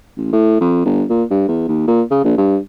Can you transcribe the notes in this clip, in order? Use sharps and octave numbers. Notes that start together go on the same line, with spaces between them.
A1
A2
F2
G1
A#2
G2
E2
D#2
A#2
C#3
A#1
G2